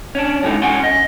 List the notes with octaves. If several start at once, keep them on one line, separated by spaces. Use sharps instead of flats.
C#4 D4
A2 E3 G#3 A3 D#4 F4
C#4 F#5 G#5 C6
D#5